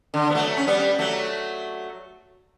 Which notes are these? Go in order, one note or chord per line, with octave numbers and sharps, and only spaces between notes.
D3
B3
F#3 A3
C#4
G3 B3
F#3 A3